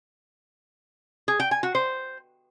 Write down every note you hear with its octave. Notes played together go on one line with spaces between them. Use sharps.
G#4
G5
G#5
F#4
C5